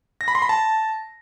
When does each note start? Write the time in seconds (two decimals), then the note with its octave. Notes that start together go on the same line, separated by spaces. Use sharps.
0.21 A#6
0.28 B5
0.35 C6
0.42 B5
0.49 A5